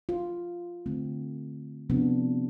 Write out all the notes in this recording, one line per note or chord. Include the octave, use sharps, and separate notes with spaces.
F4
D3 A3 C4
C3 F3 B3 D4